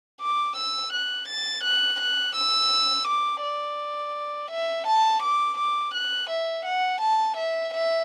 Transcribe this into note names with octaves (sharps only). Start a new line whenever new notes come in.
D6
E6
F#6
A6
F#6
F#6
E6
D6
D5
E5
A5
D6
D6
F#6
E5
F#5
A5
E5
E5